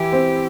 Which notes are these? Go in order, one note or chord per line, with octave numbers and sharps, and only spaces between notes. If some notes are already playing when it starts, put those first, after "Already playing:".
Already playing: E3 E4 G4
C4 C5